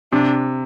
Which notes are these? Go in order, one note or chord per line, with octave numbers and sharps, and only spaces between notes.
C3 D4